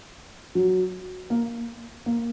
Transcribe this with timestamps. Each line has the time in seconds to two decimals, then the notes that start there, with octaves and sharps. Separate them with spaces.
0.55 F#3
1.30 A#3
2.06 A#3